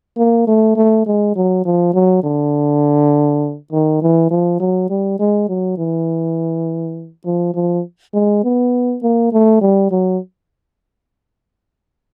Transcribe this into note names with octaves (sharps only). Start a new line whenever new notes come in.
A#3
A3
A3
G#3
F#3
F3
F#3
D3
D#3
E3
F3
F#3
G3
G#3
F#3
E3
F3
F3
G#3
B3
A#3
A3
G3
F#3